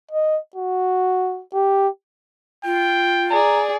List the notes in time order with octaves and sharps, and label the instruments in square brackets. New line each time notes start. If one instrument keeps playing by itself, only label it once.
[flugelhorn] D#5
F#4
G4
[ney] F4 [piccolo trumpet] G5
[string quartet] G#4 D5 [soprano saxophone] A#5